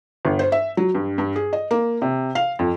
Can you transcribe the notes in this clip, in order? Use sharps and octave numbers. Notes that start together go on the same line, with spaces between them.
G1
C5
E5
F#3
G2
G2
G#4
D#5
A#3
C3
F5
F2